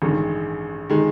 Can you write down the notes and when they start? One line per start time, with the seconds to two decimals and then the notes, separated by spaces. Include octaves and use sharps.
0.02 A1 G2 D#3 G#3
0.90 D#3 G#3